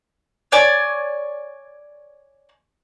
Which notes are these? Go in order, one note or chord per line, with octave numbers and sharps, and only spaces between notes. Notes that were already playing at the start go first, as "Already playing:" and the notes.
C#5 D5 G#5